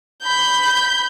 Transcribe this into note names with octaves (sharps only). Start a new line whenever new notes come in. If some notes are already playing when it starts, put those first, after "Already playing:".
B5 G6